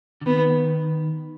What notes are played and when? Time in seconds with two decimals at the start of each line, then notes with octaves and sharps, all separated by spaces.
0.21 D3
0.26 D#3 B3